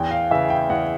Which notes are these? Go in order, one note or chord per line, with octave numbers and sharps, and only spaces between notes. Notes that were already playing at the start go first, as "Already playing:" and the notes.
Already playing: E2 G5
F5
C#3 E3 E5
G5
E2 F#5